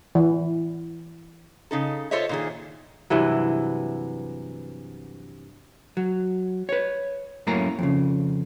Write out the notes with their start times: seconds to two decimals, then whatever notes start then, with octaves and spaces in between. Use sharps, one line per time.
0.15 E3
1.71 C#3 D#4 A4
2.11 F4 A4 C5 C#5 D#5 E5
2.29 A#2 D#3 G#4
3.10 G2 C3 E3 F#3
5.97 F#3
6.69 B4 C#5
7.47 F#2 A2 A#3 C#4 E4 A#5
7.79 F2 C#3